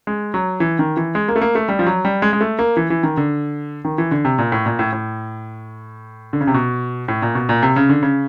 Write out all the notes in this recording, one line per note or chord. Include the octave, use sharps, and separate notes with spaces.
G#3
F#3
E3
D#3
E3
G#3
A#3
A3
A#3
A3
G3
F3
F#3
G3
G#3
G#3
A3
A#3
E3
E3
D#3
D3
D#3
E3
D3
C3
A#2
A2
A#2
A2
A2
D3
C#3
C3
B2
A2
A#2
B2
A#2
C3
C#3
D3
C#3